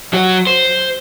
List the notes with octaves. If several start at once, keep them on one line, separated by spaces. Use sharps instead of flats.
F#3 F#4
C5